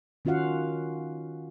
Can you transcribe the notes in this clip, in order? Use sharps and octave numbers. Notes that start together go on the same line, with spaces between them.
D#3 C#4 F4 F#4 F5 F#5